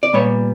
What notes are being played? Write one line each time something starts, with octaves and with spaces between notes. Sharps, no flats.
D5
A#2 G3 B3 C#5